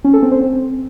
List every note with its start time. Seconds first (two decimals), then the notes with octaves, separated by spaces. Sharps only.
0.05 C#4
0.14 A4
0.23 C4
0.32 C5
0.41 C4